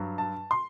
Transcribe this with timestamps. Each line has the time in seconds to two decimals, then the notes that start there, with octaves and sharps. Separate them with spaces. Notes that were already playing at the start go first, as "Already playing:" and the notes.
Already playing: G2 F#3
0.18 A5
0.51 C6